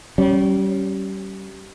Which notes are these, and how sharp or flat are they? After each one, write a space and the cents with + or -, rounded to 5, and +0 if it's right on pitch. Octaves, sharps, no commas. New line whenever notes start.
G3 -30 C#4 +0